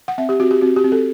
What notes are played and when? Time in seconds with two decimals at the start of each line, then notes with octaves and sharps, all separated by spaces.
0.08 F#5
0.18 C4 E5
0.29 G4
0.40 C4 F#4
0.51 G4
0.61 C4 F#4
0.76 G4
0.84 C4
0.92 A4